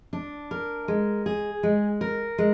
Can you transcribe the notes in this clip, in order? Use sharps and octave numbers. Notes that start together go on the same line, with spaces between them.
D4
A#4
G#3
G#4
G#3
A#4
G#3